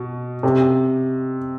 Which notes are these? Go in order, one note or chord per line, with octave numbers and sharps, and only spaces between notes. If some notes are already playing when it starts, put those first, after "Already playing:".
Already playing: B2
C3